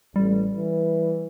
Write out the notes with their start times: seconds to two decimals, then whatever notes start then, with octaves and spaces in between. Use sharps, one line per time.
0.16 A1 G3
0.55 E3